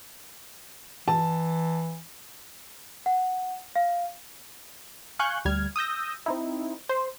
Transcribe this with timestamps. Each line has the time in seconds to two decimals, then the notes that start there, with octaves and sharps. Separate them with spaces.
1.08 E3 A5
3.06 F#5
3.76 F5
5.19 F5 G#5 C#6 F#6 G6
5.45 D2 G3 F6 G#6
5.76 D#6 E6 G6 A#6
6.26 C4 D#4 E4
6.89 C5